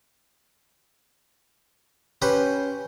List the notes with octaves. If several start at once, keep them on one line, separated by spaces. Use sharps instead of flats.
C#4 G4 B4 C5